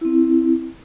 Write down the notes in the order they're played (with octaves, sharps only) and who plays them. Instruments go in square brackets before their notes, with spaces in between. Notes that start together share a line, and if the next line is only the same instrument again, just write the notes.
[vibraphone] C4 E4